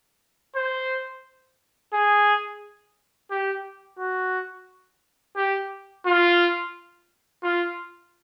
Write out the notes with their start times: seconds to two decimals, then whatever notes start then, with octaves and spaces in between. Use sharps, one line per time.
0.55 C5
1.93 G#4
3.31 G4
3.99 F#4
5.36 G4
6.06 F4
7.43 F4